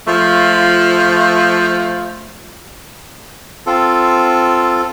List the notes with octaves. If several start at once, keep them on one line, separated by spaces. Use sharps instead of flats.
F3 A3 F4
C4 F4 A4